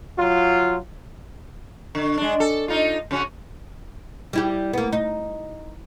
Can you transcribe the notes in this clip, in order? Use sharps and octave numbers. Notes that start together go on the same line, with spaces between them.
F#3 F4
D3
G#3 D4
A4
D#4 F4
C#3 C#4 F#4
G3 E4 G4
A#3 B3
D#4